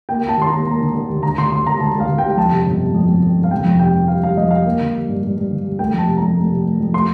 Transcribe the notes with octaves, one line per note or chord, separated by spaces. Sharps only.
A#3 G5
A#3
A5
D#2 C6
A#5
A#3
A#3 A#5
D3
D3
D#2
D2 A#5
D2 C6
D2 C6
D2 A#5
D2 A5
D2
F5
D2
G5
G3
F2 A5
C3
G1
C3
F2
F2
F2
G1
F5
F1 G5
F2
C3 G5
F2
G3 F5
G3 F5
F2 D#5
G3 F5
A#3
D3
G3
G2
G2
G2
D3
G3
A3 G5
F2 A5
C3
F2 A#5
A3
C3
A3
F2
A3 C6